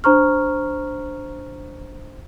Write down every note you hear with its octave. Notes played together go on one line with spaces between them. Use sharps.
D4 C5 A#5 C#6 F6